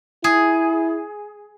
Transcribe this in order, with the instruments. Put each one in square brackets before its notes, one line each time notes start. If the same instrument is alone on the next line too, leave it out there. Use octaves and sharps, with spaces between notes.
[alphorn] E4 [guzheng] G#4